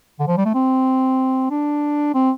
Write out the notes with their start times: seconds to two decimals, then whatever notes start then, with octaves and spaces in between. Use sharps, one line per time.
0.20 D3
0.28 F3
0.37 G3
0.45 A3
0.54 C4
1.51 D4
2.14 C4